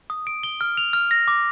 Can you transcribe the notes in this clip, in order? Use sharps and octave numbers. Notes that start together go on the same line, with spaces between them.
D#6
D7
G7
F6
F7
F6
A#6
D6